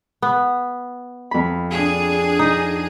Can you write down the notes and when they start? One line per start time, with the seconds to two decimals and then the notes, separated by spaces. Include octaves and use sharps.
0.22 B3
1.31 F2 B5
1.70 D4 G#4
2.39 D#4